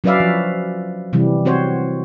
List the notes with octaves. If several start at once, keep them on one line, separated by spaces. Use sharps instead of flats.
F#3 C#4 B4 D5 E5 F5
F3
C3 E3 G3
C4 F#4 C5 C#5